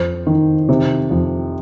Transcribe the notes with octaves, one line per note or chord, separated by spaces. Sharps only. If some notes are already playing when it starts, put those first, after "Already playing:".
Already playing: F2 C5
D#3
C3
F2